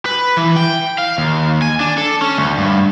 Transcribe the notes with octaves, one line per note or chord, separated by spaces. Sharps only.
B4
E3
G5
F5
D#2
G#5
D4
A4
C#4
D2
G2